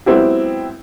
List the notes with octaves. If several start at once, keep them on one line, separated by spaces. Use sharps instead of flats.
F#3 G#3 B3 C4 E4 G4